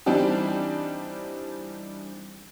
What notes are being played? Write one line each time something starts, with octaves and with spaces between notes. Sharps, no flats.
E3 G3 C4 D4 D#4 G4